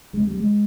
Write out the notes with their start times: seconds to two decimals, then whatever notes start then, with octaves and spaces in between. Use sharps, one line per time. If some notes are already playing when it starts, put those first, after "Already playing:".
0.13 D2 C3 G#3
0.27 G3
0.40 G#3